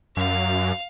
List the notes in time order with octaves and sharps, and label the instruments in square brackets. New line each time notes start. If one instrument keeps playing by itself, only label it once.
[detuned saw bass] F#2 [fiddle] F5